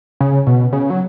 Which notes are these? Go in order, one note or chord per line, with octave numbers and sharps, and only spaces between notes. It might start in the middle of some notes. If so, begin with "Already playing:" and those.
C#3
B2
C#3
F#3